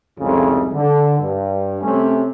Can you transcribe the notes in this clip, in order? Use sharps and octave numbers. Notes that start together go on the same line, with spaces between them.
C2 F2 G#2 C#3
D3
G2
C3 A3 C#4